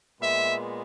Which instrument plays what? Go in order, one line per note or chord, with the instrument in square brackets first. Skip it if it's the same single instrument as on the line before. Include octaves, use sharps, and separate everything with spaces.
[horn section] A#2 G#3 B3 E5